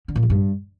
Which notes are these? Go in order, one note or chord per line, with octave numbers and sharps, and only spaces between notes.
D3
A#2
F3
G2